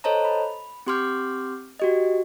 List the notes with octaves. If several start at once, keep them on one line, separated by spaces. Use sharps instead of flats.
A4 C5 C#5 D#5 A5 A#5
B5
C4 G4 C6 D6 F6 G6
F#4 G4 D#5